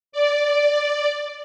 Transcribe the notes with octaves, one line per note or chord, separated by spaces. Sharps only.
D5